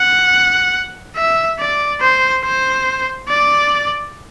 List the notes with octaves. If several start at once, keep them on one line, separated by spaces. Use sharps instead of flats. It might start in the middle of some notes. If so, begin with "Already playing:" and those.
Already playing: F#5
E5
D5
C5
C5
D5